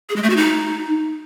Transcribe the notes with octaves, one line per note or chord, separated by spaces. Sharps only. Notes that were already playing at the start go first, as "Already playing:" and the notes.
G#4
G#3
A3
F#4
D#4